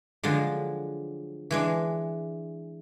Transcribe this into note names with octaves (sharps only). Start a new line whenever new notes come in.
D3 F3 F#3 G#3
E3 G#3 D4